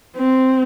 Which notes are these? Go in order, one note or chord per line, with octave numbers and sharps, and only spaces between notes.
C4